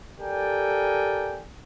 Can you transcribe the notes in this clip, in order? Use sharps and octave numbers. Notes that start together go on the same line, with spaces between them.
G4 A4 A#4 D5 G5 G#5